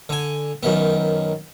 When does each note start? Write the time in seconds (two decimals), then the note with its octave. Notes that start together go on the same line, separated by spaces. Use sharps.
0.09 D3 G#5
0.63 F#2 D#3 B3